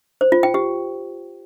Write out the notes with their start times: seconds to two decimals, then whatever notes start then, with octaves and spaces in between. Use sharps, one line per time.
0.21 C5
0.32 F4
0.43 G5
0.54 G4